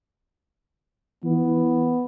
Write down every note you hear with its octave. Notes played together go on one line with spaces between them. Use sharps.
E3 B3